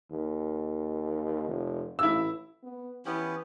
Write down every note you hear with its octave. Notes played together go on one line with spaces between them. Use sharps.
D#2
F1
A1 E4 E6
B3
E3 B3 C#4 E4 G4